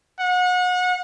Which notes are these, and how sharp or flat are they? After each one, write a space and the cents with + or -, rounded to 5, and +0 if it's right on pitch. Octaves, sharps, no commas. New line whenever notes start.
F#5 -35